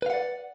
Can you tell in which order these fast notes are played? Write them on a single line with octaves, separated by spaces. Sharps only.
B4 F5 F#5 D5